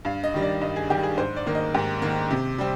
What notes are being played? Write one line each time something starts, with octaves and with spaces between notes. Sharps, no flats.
G2 F5
D#5
D#3 G3
D5
G2 D#5
G#4
D#3 G3 G4
G#4
G#2 C5
D5
D#3 A#3
D#5
G#2 G4
D#3 A#3
C3
G3 C4